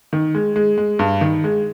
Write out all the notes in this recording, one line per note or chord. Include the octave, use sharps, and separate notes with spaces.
D#3
G#3
G#3
G#3
G2
D#3
G#3